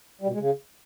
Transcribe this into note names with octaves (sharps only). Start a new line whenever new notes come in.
G3
B2
G#3
C#3